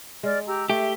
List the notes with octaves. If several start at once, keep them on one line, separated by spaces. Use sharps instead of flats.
G#3 D5 F6
G4 A#5 E6
A3 G4 E5